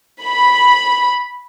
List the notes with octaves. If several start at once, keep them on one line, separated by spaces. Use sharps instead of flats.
B5